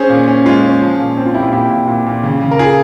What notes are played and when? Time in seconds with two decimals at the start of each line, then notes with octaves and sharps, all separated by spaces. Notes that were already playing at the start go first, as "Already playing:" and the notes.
Already playing: C#4 G#4 C5
0.10 A#2
0.28 C#4
0.46 G#3 F4 G#4
0.63 C#4
0.82 F3
0.99 A#2
1.17 C4
1.26 F4
1.34 A#2 E4 G4
1.43 F4
1.52 A#2 E4 G4
1.70 A#2
1.87 A#2
2.06 A#2
2.24 C#3
2.41 C#3
2.51 A#4
2.59 F4 G#4